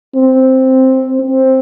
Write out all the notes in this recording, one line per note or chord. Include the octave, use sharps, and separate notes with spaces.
C4
C4